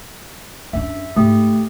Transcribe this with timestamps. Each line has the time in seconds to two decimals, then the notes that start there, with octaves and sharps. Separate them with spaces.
0.73 F#2 D4 E5
1.16 G#2 A3 G4